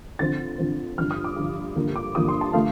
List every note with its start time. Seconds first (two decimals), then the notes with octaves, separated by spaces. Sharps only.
0.19 D3 F3 C4 A6
0.58 D3 F3 C4
0.98 G2 D3 F3 F6
1.11 D#6
1.24 D6
1.36 G2 D3 F3
1.76 G2 D3 F3 A#3
1.96 D6
2.15 G2 D3 F3 A#3 D#6
2.28 C6
2.41 A5
2.53 D3 F3 A3 F5